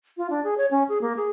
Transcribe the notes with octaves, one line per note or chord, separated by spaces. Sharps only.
F4
D4
G#4
C#5
C#4
G#4
A#3
G#4